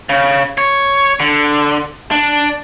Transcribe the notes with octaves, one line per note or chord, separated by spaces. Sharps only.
C#3
C#5
D3
D4